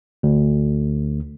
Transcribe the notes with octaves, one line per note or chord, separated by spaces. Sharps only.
D2